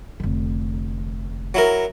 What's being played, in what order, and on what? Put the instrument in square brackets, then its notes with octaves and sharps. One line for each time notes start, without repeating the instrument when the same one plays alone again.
[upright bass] F1 D3
[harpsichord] F#3 E4 A#4